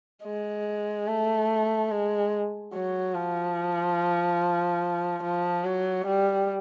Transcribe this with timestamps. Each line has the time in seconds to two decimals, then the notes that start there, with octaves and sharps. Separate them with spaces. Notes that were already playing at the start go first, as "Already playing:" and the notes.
0.24 G#3
1.07 A3
1.91 G#3
2.73 F#3
3.14 F3
5.23 F3
5.64 F#3
6.06 G3